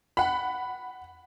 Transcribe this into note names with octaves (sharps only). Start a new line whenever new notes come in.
F#5 B5